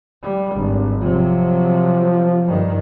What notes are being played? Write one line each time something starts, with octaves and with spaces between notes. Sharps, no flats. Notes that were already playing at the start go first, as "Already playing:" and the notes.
G3
G#1 G2
C3 F3 F#3
G2 D#3